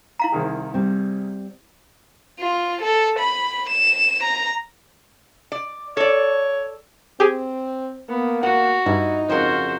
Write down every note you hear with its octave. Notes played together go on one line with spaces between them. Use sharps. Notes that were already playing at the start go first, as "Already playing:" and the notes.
E4 F5 A#5
C2 D#3 G#4
G3 C4
F4
A4
B5
E7
A#5
D5
A4 C#5 D5
C4 G4 G#4
A#3 B3
F#4 F#5
G2 D#4 E4
F2 C#3 F#4 A#4 C5